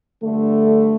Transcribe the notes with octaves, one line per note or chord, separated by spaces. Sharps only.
G2 D3 A3